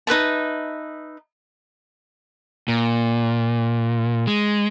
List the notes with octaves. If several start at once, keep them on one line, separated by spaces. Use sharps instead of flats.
D#4 B4 E5 A5
A#2
G#3